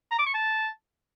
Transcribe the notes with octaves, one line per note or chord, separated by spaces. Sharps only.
A#5
D6
C#6
A5